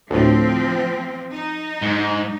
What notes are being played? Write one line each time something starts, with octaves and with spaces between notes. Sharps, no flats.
D2 A2 F3 C4
D#4
G#2